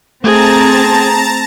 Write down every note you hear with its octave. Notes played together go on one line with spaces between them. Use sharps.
A3 C4 G#4 A5 A#5 A6